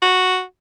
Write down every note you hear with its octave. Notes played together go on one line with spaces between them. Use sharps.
F#4